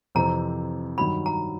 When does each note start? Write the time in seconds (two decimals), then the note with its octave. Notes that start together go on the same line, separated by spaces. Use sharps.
0.15 F2 C3 E3 A#5
0.98 G2 D#3 F#3 B5
1.26 A#5